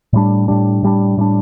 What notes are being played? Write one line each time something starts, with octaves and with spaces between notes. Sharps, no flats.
A2 G3 D4
A2 G3 D4
A2 G3 D4
A2 G3 D4